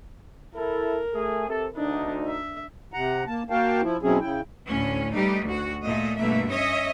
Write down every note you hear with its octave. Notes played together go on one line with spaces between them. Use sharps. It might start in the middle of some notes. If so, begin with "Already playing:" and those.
E4 A4 A#4
A3 G#4
C3 A4
D2 D4 D#4
E5
C3 F#5 A#5
A#3 A5
A#3 F#4 A#4 F5 G5 A5
F3 E4
B2 F#3 C4 C#4 E4 G#4
C#3 E4 G5
D2 A2 C#4
G3 A3 D#4 G4 B4
D2 F#4
A#2 A3 D#5
G2 B2 A3 A#3 E5
C#4 C#5 D#5 E5